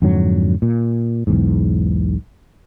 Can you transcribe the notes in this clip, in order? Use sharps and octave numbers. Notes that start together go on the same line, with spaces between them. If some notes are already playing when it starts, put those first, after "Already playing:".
F2 G#2 D3 F#3
A#2
B1 E2 G#2